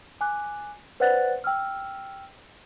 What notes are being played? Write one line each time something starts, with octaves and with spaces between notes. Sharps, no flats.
G#5 D6 F#6
B4 C5 D5 F#5 F#6 A6
G5 E6 F6